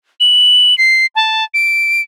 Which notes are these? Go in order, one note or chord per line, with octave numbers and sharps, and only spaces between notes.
F#7
C7
A5
D7